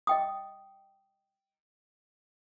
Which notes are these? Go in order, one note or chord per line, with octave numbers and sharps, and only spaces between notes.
D#5 G5 D#6